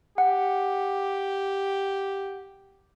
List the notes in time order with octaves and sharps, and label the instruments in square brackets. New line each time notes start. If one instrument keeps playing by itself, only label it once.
[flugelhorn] G4 [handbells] F#5